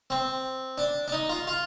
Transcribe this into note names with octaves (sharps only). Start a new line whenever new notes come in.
C4
D4
D4
D#4
F4
F4